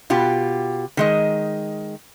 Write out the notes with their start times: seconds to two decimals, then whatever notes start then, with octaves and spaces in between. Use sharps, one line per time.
0.10 B2 F4 G4
0.97 D#3 G#3 D#5